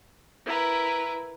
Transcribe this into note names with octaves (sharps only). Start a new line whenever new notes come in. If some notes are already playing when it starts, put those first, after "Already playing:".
E4 A#4 B4